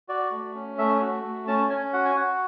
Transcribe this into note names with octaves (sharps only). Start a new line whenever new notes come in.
F#4 D5
A3
C#4
A3 E5
F#4
A3
C#4 A5
C#4 G#5
F#4 F#5
G#5
F#4 F#5